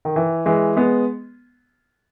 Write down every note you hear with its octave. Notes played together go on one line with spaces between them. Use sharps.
D#3
E3
E3 G#3
G#3 B3